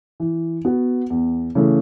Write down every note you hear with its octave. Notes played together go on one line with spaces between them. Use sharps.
E3
B3 F#4
E2
C#3 E3 A3